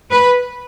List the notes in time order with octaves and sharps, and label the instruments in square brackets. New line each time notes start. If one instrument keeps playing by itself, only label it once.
[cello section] B4